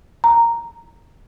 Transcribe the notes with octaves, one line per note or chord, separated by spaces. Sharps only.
A#5